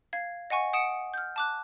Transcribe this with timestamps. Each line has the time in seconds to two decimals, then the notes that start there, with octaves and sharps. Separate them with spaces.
0.13 F5 G#6
0.50 D#5 F#5 G#5 C#6
0.73 F#5 D#6 C#7 D7 E7
1.14 F6 G6
1.36 A5 D6 F#6